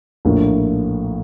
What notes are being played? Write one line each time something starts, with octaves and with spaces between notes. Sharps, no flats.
A#1 A2 F3 A#3